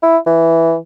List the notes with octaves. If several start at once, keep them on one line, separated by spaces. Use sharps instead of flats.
E4
E3